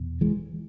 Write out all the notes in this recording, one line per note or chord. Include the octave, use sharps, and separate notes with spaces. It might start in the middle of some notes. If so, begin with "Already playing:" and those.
Already playing: E2 B2
E3 G#3